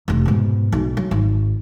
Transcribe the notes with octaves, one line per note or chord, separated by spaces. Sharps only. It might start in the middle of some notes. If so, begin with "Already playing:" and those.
F1 C3
G#2 B2
B1
F#3
G#1